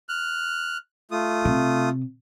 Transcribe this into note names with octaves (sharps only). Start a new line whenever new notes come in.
F6 F#6
A3 F4 D#6
C3